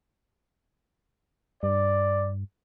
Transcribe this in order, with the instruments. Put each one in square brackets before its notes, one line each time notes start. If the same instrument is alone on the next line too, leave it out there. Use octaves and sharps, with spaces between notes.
[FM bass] G2 [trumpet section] D5